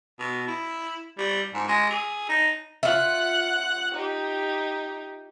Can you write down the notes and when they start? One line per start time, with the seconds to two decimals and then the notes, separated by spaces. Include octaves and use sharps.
0.19 B2
0.47 E4
1.18 G3
1.54 G#2
1.68 G#3
1.90 G#4
2.29 D#4
2.83 F4 E5 F#5 F#6
3.95 D#4 G4